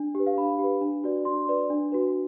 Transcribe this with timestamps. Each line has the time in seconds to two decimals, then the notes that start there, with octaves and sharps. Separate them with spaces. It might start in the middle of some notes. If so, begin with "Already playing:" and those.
Already playing: D4
0.15 G4 B4
0.27 F5
0.38 D4 B5
0.59 G4 B4
0.81 D4
1.04 F#4 B4 D5
1.25 D4 C6
1.49 F#4 B4 D5
1.70 D4
1.92 F#4 B4